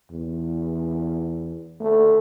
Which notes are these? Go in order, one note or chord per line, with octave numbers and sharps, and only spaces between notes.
E2
A3